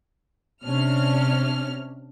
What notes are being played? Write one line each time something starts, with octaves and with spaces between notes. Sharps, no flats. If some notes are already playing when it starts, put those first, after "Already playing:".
C3 C#4 D4 F6